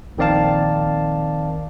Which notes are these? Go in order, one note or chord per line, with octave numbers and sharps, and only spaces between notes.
A#1 D#3 C4 D5 F5 A5